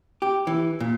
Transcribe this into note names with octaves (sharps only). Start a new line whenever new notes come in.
G4
E3
A#2